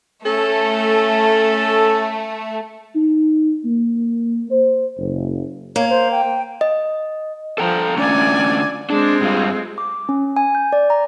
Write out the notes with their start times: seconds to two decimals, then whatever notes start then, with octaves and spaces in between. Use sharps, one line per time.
0.25 A3 C#4 A4
2.95 D#4
3.64 A#3
4.51 C5
4.98 F#1
5.76 A#3 C#5
5.90 C5
6.12 G5
6.61 D#5
7.58 F3 A4 G5 A#5
7.97 D3 A3 C#4 D5 G#5
8.90 G#3 C4 D4
9.21 G2 G3 F4
9.78 D6
10.09 C#4
10.37 G#5
10.55 G6
10.73 D5
10.90 A#5